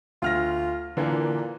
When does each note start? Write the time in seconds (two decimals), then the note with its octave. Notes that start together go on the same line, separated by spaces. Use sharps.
0.22 D2 F4 F6 A#6
0.97 A#2 D3 E3 A#3